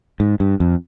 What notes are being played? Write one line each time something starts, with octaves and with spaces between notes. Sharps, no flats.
G#2
G2
F2